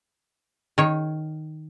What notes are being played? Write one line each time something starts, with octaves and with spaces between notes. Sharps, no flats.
D#3 C#5